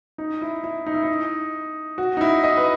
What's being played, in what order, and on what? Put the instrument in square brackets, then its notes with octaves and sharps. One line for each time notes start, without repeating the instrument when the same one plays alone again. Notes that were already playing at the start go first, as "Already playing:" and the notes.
[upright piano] D#4
E4
E4
D#4
E4
D#4
F#4
D#4
E4
D#5
B4